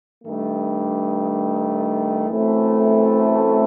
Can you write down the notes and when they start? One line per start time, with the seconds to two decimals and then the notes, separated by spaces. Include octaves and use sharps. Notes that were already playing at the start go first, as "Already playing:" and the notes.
0.24 G2 D#3 A3
2.27 F#2 E3 A3 C4